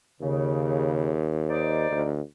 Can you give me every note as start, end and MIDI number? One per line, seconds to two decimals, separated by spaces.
0.21 1.86 39
0.21 1.15 49
1.49 2.06 63
1.49 2.06 72
1.49 2.06 74
1.91 2.21 38